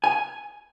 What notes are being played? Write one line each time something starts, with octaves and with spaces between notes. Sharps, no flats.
G#5